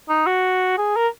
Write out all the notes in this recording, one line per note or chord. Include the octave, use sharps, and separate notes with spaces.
D#4
F#4
G#4
A#4